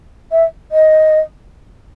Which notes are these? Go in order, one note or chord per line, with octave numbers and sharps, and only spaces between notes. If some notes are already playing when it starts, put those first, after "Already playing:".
E5
D#5